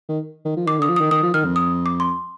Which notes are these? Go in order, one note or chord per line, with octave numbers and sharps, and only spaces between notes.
D#3
D#3
F3
D#3 D6
D3
D#6
F3
D#3 D#6
D#3 D#6
F3
D#3 F6
F2
D#6
D6
C6